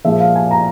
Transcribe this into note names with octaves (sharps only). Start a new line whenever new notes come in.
A#2 F3 G#3 E5
F5
G#5
A#5